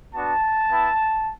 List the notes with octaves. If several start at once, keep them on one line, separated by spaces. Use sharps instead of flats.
B3 D4 F#4 A5
B3 E4